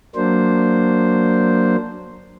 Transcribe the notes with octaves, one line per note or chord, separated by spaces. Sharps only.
F#3 A#3 D4 C5